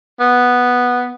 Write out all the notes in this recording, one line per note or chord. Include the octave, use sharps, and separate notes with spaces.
B3